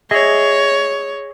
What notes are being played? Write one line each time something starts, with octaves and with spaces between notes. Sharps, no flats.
G#4 C#5 D#5 E5